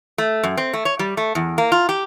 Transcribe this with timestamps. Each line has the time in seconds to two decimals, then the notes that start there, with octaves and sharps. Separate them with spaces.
0.18 A3
0.43 F#2
0.57 C4
0.73 A3
0.85 C#5
0.99 G3
1.17 A3
1.35 E2
1.58 A#3
1.72 F4
1.89 G4